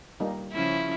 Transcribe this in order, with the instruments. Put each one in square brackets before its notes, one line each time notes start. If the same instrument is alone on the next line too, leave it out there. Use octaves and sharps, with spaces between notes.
[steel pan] G3 A#3 D#4
[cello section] C#3 F3 C#4 [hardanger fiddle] E4